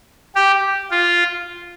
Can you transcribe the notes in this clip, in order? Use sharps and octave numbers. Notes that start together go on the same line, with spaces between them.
G4
F4